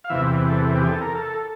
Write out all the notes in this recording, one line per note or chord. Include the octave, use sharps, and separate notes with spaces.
F5
E2 C3 E3 E5
A4
G4
G#4
A4
A#4
A4